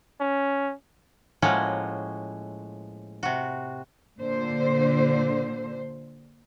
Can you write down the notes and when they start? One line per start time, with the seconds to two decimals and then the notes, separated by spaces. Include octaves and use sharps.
0.20 C#4
1.42 A2 F3 G#3 A#3 C#4 F#4
3.23 C3 F#4
4.17 A#2 D3 C5